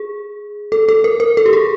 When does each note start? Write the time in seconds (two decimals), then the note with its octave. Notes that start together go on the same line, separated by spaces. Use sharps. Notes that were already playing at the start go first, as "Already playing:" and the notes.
Already playing: G#4
0.72 A4
0.89 A4
1.04 A#4
1.20 A#4
1.37 A4
1.46 G4
1.53 G#4